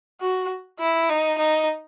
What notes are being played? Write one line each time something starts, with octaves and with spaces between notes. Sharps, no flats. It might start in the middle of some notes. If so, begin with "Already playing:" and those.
F#4
E4
D#4
D#4